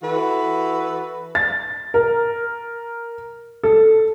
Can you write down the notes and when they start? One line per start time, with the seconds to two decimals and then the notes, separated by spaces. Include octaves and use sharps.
0.03 E3 F#4 A4 B4
1.35 A6
1.94 A#4
3.64 A4